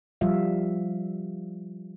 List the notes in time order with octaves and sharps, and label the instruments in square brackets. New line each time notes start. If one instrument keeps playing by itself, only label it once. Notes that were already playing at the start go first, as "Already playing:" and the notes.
[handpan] F3 G3 F4 E5 F5